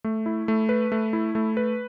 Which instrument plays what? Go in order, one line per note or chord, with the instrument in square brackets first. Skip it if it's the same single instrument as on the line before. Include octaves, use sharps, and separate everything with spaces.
[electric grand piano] A3
E4
A3
B4
A3
E4
A3
B4